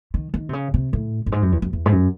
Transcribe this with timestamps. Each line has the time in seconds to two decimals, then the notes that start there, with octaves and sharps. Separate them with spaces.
0.14 D#3
0.34 D#3
0.49 C3
0.53 C#3
0.74 C3
0.93 A2
1.26 F#2
1.32 G#2
1.42 F#2
1.52 E2
1.62 F#2
1.73 E2
1.86 G#2
1.92 F#2